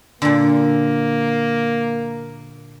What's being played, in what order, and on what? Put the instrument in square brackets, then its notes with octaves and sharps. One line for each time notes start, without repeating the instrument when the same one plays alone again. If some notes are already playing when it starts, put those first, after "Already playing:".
[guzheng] A#2 D3 [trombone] A#3